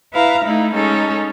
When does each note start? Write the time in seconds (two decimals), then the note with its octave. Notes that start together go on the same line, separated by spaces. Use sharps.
0.12 E4 B4 F5 A#5
0.45 A3 D#4 E4
0.73 G#3 C#4 D#4 A4